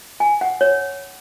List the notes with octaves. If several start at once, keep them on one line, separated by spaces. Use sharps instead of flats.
G#5
F#5
C#5